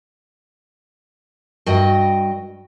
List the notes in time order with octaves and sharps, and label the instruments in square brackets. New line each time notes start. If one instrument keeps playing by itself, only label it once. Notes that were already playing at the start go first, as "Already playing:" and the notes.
[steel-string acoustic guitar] G2 F#4 D#5 G5